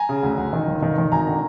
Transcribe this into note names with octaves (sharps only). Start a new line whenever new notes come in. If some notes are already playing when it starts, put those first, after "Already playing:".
Already playing: G#5 A#5
C#3
D2
D2
D#3
G1
D#3
D#3
G#1 G#5 A#5
D3